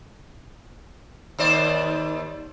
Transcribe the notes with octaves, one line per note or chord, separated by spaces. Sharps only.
D#2 C5 D5